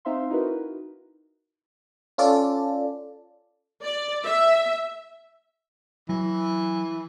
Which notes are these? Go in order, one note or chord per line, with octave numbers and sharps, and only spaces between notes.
C4 D#4 C5 E5 F5 C6
D#4 E4 F#4 A#4 B4
C#4 F4 A4 D5
D5
E5
E3 F#3